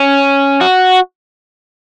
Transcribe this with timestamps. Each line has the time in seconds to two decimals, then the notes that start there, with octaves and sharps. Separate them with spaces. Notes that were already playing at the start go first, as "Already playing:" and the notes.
Already playing: C#4
0.61 F#4